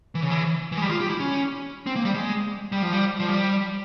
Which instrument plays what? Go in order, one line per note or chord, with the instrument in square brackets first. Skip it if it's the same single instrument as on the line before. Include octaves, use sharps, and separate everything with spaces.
[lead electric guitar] E3
C#3
E3
E3
G#3
G3
G4
F4
G4
E4
C#4
C4
A#3
G3
G#3
G3
F3
G3
F3
G3